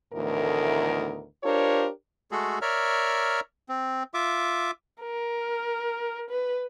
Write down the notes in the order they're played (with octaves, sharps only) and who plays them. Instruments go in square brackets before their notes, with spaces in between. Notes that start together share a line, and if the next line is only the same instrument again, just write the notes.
[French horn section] D2 A2 D#3 E3 B3 A#4
D4 F4 G4 A#4 C5 C#5
[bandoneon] G#3 A3 F#4 G#4 A4
A#4 C#5 D5 E5 A#5 F6
C4
F4 E5 D6
[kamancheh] A#4
B4